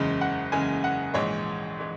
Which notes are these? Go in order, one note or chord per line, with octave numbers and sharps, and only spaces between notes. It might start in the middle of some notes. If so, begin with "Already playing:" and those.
Already playing: F#1 E2 C#3 G#3
F#5
F#1 E2 C#3 G#3 G#5
F#5
A#1 G#2 E3 G#3 C#5
E3 G#3